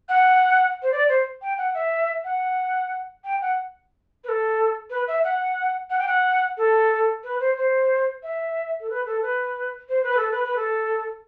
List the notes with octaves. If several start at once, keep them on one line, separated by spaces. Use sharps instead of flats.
F#5
C5
D5
C5
G5
F#5
E5
F#5
G5
F#5
B4
A4
B4
E5
F#5
F#5
G5
F#5
A4
B4
C5
C5
E5
A4
B4
A4
B4
C5
B4
A4
B4
B4
A4